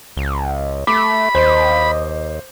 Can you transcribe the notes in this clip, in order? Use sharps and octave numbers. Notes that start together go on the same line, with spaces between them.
C#2
A3 B5 D6
D#2 C5 D#5